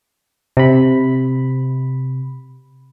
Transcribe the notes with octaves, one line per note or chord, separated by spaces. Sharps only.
C3 B5